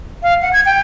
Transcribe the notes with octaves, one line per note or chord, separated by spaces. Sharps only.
F5
F#5
G#6
G5